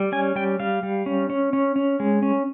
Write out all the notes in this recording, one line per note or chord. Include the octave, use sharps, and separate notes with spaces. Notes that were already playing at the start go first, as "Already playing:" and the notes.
Already playing: G3
C#4 G#5
G3 G5
G3 F5
G3
C#4
C#4
C#4
C#4
G#3
C#4